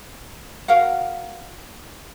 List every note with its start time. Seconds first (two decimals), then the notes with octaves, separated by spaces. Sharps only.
0.68 F#4 A#4 F5 F#5